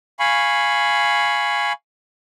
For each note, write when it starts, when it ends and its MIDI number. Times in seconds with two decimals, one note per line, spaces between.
0.20 1.73 77
0.20 1.73 80
0.20 1.73 83
0.20 1.73 85